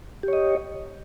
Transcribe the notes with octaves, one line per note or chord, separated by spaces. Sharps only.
G4 C#5 D#5